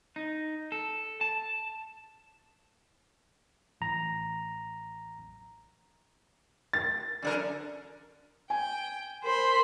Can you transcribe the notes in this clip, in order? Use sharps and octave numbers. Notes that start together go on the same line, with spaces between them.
D#4
A4
A5
A1 A#5
A6
F#2 D3 A#4
G5 G#5
A#4 C5 B5 C6